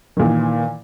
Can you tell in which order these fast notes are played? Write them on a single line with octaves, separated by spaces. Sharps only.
D#3 A#2 E3